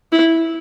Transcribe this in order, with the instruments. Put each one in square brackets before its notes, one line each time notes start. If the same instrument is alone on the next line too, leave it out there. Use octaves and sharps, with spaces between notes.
[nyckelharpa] E4